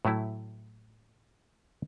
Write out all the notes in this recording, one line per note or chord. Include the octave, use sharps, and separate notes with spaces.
A2 F#3 A3 E4